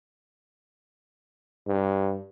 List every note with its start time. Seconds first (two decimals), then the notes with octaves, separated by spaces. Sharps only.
1.68 G2